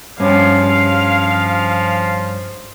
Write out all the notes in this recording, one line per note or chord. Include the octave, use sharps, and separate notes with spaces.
G2 F3 C#4 F5